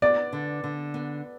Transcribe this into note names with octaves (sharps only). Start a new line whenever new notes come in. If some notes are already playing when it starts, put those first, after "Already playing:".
B3 D5
D3
D3
B3